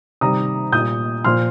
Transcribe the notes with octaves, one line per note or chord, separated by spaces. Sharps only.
C3 D#3 G3 A#5 D#6
A#2 G3 D#6 G6
A#2 F3 C6 F6